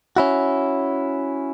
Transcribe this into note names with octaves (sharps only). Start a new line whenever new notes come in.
C#4 E4 F#4